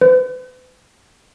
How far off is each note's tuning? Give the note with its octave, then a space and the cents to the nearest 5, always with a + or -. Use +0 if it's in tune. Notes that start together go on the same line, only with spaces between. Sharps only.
B4 +45